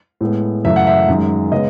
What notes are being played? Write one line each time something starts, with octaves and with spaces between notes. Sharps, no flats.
A2 G#3 B3
F#2 C#3 E3 A3 E5
F#5
E5
F#2 D#3 G#3
C#3 G#3 B3 D#5